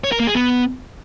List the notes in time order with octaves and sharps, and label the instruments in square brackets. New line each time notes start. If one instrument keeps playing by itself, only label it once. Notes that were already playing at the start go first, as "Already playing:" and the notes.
[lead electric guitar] C#5
A#4
A#3
G#4
B3